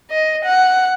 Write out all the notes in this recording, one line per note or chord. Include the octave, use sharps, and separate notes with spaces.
D#5
F#5